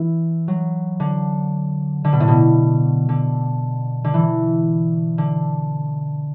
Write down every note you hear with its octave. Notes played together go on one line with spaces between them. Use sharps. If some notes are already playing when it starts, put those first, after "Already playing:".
Already playing: E3
F#3
D3
D3
B2
A2
B2
D3
D3
E3
D3